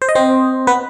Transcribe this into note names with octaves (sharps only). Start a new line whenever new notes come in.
C5
D#5
C4 C5
B3 B4